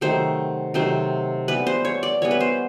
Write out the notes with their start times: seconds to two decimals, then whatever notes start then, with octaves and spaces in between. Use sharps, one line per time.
0.01 C3 D#3 F#3 A3 C5
0.74 C3 D#3 F#3 A3 C5
1.48 E3 G3 B3 B4
1.67 C5
1.85 C#5
2.03 D5
2.22 E3 G3 B3 C#5
2.31 B4
2.40 C5